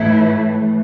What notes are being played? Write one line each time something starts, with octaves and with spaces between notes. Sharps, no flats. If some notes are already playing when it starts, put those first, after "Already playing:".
Already playing: A2 E3 A3 E4